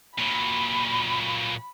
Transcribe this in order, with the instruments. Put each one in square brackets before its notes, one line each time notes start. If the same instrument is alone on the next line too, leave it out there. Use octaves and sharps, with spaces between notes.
[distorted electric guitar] A#2 F#3 [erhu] B5